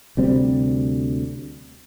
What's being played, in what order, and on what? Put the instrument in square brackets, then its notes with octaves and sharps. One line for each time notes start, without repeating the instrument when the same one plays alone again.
[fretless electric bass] D2 C3 G3 C4